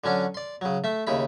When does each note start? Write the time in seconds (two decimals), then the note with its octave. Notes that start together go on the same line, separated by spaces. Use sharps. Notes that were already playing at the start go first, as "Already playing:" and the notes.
0.04 D3 F#3 C#4 D4
0.35 D5 C6
0.61 C#3 F#3
0.84 A3 E5
1.07 D#2 C#3 E4 B5